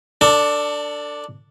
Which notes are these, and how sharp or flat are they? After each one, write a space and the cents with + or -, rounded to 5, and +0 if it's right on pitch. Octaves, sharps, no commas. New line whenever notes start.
D4 +0 A4 +30